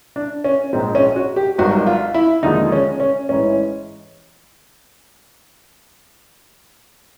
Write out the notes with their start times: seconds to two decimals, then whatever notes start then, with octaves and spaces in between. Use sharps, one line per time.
0.16 D4
0.44 C#4
0.73 A#1 G#2 F3 G#3 C4
0.95 C#4
1.16 F#4
1.36 G4
1.58 G#1 G2 D#3 F#3 F#4
1.87 F4
2.14 E4
2.43 D#2 D3 F3 G#3 D#4
2.72 C#4
3.00 C#4
3.29 A1 G#2 E3 C#4